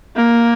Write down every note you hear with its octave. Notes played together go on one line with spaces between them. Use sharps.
A#3